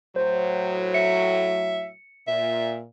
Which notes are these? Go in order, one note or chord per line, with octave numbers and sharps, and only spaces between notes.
A2 F#3 C5
E5 C#7
A#2 E5